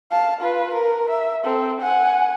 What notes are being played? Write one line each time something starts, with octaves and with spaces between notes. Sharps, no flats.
F5 A5
F4 B4
A#4
E5
C4 A4
F#5 G#5